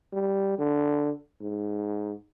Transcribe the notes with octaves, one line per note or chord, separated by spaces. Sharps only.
G3
D3
G#2